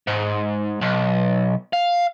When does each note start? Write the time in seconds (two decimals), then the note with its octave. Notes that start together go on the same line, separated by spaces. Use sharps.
0.08 G#2
0.81 B1
1.73 F5